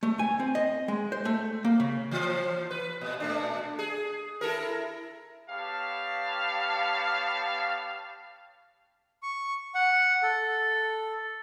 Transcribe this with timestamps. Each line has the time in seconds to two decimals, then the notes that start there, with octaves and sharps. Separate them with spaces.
0.03 A3
0.19 G#5
0.40 C4
0.55 D#5
0.88 G#3
1.12 C5
1.25 A3
1.65 A#3
1.80 C#3
2.11 E3 F3
2.71 B4
3.01 A#2
3.20 A#2 A3 D4
3.79 G#4
4.41 E4 A4 A#4
5.49 B3 G4 C#5 F5 A5
9.23 C#6
9.75 F#5
10.23 A4